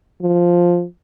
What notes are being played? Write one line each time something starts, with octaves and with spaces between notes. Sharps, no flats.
F3